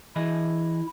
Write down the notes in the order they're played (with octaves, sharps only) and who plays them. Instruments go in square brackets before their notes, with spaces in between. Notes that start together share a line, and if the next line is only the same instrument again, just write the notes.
[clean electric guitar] E3 G#4 D#5 [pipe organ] E4